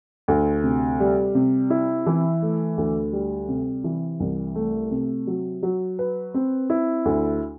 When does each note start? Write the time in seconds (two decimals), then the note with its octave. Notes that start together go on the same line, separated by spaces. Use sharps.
0.28 D2
0.64 C3
1.00 G3
1.35 C3
1.70 E4
2.06 E3
2.42 A3
2.77 D2
3.13 G3
3.48 C3
3.84 E3
4.20 C2
4.55 A3
4.91 C3
5.27 F#3
5.63 F#3
5.99 B4
6.34 C4
6.70 E4
7.05 D2